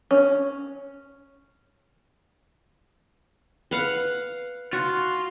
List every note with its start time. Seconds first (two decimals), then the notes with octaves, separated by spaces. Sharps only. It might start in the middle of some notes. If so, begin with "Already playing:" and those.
0.11 C#4
3.71 B4 F5 F#5
4.73 F4 F#4